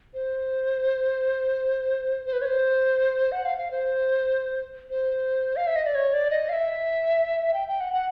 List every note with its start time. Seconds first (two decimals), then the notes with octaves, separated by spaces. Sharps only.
0.14 C5
2.26 C5
2.33 B4
2.41 C#5
2.46 C5
3.32 F#5
3.45 F5
3.58 F5
3.71 C5
4.90 C5
5.56 F5
5.67 E5
5.76 D#5
5.86 D5
5.95 C#5
6.14 D5
6.31 D#5
6.49 F5
6.53 E5
7.54 G5
7.68 G5
7.81 F#5
7.93 F#5